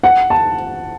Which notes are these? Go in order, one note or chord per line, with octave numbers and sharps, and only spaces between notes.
F#5
A5